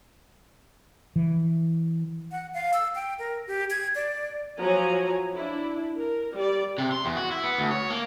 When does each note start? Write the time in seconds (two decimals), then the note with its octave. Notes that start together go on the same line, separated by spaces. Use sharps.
1.16 E3
2.32 F#5
2.54 F5
2.73 E6
2.95 G5
3.19 A#4
3.47 G4
3.70 G#6
3.95 D5
4.59 F3 F#3 G#5 A#5
5.34 D4 E4
5.96 A#4
6.33 G3 D5
6.78 C3
6.92 C6
7.05 E2
7.17 F#4
7.31 E4
7.43 B3
7.58 D2
7.71 C#5
7.90 A#3